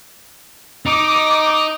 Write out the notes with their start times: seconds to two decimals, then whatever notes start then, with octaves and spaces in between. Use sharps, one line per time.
0.86 D#4 D6